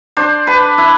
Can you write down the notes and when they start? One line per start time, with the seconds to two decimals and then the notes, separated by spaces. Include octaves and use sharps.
0.17 D4 C5
0.47 B4 A5
0.78 E4